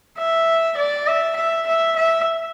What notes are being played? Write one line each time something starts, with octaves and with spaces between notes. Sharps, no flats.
E5
D5
E5
E5
E5
E5